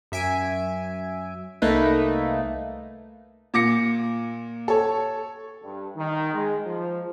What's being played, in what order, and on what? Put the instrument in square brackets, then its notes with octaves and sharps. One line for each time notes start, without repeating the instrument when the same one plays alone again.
[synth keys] F#2 E5 G#5 D7
C2 A3 A#3 D#4 B4
[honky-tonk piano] A#2 D6 A#6 C#7
A4 C#5
[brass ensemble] G2
D#3
G#3
F3